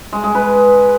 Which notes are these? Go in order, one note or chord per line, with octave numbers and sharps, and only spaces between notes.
G#3
G#3
B4